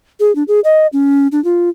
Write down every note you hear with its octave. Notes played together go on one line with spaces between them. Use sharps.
G#4
D4
G#4
D#5
C#4
D4
F4